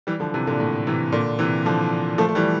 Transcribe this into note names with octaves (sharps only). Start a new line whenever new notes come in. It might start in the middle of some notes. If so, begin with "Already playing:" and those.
E3 G3
D3 F3
C3 E3
A#2 D3
A2
C3 E3
A#2 D3
C3 E3
D3 F3
F3 A3
A3
E3 G3